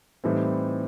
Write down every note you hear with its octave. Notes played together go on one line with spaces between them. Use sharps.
A2 E3 G3 C4 D#4